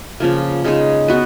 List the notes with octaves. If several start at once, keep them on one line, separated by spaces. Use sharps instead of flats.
C#3 F3 A#3
C#3 G#3 D#4 G#4
B3 F#4 B4